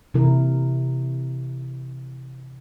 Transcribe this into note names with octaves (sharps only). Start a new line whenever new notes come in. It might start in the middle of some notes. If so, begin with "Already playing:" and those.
C3 E3 E4 A#4